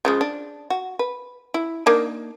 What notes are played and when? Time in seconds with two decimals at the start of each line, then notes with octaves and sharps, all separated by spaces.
0.05 C#3 F3 G#3
0.21 D4
0.70 F#4
0.99 B4
1.54 E4
1.86 A#3 D4 D#4